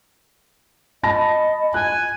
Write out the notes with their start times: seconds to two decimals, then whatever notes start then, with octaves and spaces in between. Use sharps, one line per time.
1.03 D#5 A5 B5 A#6
1.74 G#5 F#6